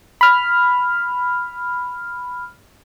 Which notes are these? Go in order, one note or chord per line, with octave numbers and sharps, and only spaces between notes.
B5 F6